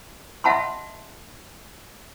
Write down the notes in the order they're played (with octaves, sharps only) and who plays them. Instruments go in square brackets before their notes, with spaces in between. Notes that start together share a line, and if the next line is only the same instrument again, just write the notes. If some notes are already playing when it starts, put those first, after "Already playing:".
[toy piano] D#5 E5 F#5 A5 B5 C6